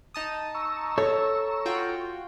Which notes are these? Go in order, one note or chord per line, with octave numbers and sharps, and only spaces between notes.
D#4 A5 D#6
A#5 C#6 E6
A4 C#5
F4 F#4 G5